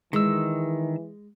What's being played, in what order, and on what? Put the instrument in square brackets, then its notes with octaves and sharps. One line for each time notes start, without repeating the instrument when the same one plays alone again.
[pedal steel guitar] D#3 E6 [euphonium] E3 [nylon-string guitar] G#3